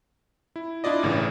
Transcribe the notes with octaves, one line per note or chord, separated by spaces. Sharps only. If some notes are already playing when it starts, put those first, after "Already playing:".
E4
D4 E4 F4 D5 D#5
G1 A2 C#3 E3